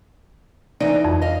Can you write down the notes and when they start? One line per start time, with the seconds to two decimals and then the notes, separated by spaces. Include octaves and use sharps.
0.81 E3 D#4 D5
1.05 F2
1.22 D#5 F5